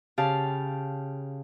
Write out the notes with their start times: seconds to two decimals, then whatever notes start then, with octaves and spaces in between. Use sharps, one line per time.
0.18 C#3 G4 F5 A5